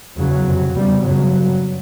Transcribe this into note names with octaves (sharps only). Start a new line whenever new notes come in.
E2 C#3 F#3
F2 C3
E2 C#3 G3
F#2 C#3 F#3
G2